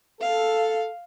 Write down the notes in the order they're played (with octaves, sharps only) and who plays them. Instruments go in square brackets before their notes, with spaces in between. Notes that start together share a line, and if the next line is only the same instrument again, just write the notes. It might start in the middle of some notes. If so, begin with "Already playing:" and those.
[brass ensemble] A4 [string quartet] F5